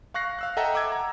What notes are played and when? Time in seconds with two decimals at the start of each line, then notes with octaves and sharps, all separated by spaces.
0.14 F5 C#6 F#6 A#6 C7
0.39 F5 E6 F#6
0.57 A4 D#5 E5 F#5 G5 A#5
0.74 F#5 D6 E6 G#6
0.92 A#5